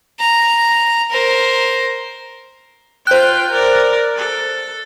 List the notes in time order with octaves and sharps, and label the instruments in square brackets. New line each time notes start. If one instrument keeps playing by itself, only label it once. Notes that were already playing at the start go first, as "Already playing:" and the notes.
[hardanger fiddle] A#5
A#4 C5
[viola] F4 G5 [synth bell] C5 F#6
[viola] A#4 D5
A4